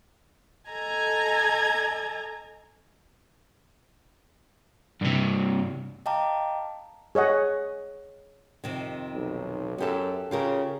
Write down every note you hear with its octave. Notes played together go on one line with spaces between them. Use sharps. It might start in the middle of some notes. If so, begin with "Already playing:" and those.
A4 D#5 G#5 A#5 G#6
G2 C3
D#5 F5 G5 A5 A#5 D6
G#4 C#5 D#5 F#5
F2 C3 D#3
B1
F#2 B3 G4 A4
C#3 F4 G4 A#4